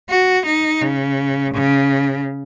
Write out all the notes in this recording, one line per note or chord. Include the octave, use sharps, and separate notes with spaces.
F#4
D#4
C#3
C#3